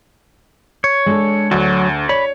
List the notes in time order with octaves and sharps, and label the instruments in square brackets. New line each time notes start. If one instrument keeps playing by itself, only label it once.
[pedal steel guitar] C#5
[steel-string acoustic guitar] G#3 D4 A4
[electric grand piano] D2 [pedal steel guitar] F#3 [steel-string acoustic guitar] D4
[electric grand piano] C#5 [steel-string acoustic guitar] D5 [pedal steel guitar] B5